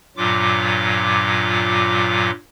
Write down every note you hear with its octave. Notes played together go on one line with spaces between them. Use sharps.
G2 A#2 F#3 F4 D6